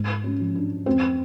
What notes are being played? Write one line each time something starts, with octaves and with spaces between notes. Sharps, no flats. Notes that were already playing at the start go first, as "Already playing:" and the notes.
Already playing: G#2
C#4
F3
D4
F2 C4